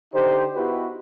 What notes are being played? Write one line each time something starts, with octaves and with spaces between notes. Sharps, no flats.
D3 D#4 G4 C5
B3 D#4 E4 F#4 G4 B4